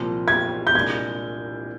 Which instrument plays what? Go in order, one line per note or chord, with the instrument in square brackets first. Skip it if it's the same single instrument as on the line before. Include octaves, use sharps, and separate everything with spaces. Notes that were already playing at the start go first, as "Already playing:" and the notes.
Already playing: [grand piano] C2 A#2 F3 C4
[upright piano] G#6
G6
[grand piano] C2 A#2 G#3 D4 [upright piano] G#6